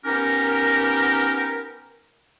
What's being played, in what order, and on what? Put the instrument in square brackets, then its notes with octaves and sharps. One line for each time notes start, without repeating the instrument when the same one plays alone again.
[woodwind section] B3 C#4 D#4 G4 A#4